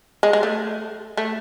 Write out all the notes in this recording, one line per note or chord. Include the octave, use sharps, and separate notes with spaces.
G#3
G#3
A3
A3